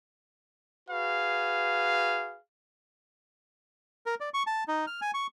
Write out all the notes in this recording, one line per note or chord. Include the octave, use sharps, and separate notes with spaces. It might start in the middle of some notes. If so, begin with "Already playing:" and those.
F#4 G#4 B4 F5
A#4
D5
C#6
A5
D#4
F6
G#5
C#6